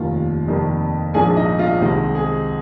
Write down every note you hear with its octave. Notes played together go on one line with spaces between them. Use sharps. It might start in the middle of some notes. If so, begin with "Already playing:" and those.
Already playing: F1 D#2 D#3 A#3 F4
F2 C3 D#3 G3 A#3
A#1 G#2 F3 A#3 D4 G#4 G#5
D#4 D#5
F4 F5
C2 C3 D#3 G#3 C4 D#4 D#5
G#4